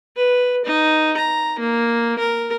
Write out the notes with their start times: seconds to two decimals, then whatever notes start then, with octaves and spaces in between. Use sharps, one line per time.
0.16 B4
0.65 D#4
1.17 A#5
1.59 A#3
2.19 A#4